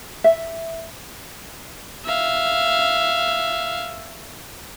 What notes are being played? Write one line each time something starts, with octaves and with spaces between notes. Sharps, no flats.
E5
E5 F5